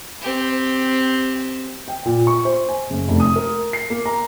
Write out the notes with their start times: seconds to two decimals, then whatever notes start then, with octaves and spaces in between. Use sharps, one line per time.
0.21 C4 G4
1.88 G5
2.05 A#2
2.27 C#6
2.45 C5
2.69 G#5
2.90 F#1
3.08 F1
3.20 D#6
3.36 A#4
3.73 C7
3.90 A#3
4.06 A#5